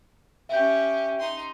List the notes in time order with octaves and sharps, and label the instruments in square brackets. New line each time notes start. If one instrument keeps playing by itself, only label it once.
[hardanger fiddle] C#4 G4 [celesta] E5 G6
[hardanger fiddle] D#4 C6